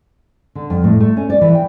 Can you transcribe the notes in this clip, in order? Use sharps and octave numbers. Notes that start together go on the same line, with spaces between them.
D3
F2
A2
A3
C#4
D5
E3
G5